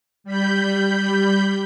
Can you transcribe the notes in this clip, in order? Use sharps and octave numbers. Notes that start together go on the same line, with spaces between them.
G3 B5 G6